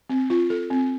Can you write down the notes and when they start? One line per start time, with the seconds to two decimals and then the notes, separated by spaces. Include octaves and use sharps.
0.10 C4
0.30 F4
0.50 A4
0.71 C4